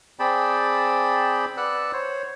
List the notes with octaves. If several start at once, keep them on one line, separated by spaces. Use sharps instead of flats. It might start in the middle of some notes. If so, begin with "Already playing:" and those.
C4 G#4 D5 G5 A5 B5
B4 D5 F#5 E6 F#6
C5 C#5